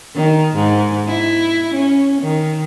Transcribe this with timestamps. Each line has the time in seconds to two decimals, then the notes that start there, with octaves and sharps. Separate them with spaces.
0.15 D#3
0.55 G#2
1.07 E4
1.74 C#4
2.22 D#3